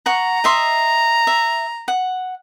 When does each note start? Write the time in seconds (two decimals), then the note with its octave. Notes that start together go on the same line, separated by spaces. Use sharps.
0.06 F#5 A#5 C#6
0.44 D#5 E5 C6
1.27 E5
1.88 F#5